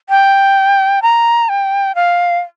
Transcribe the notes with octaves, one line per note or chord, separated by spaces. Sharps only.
G5
A#5
G5
F5